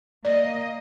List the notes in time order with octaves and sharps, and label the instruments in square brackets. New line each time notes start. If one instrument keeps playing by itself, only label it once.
[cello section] A#3 D#5 [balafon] D5